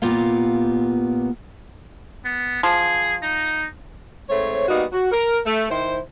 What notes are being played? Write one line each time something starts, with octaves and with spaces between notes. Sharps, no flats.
A#2 B3 F4 G4 F5
B3
F3 G#4
D#4
G#2 A3 C4 C#5
G3 A#3 B3 D#4 F#4
F#4
A#4
A3
D#3 E4 C5